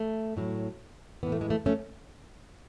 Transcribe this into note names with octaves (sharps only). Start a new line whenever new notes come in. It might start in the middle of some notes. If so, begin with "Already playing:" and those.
Already playing: A3
A2 F#3
A2 E3 B3
A3
G#3
A3
A3 C#4